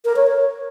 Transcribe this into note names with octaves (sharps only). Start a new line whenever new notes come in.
A#4
C#5
C#5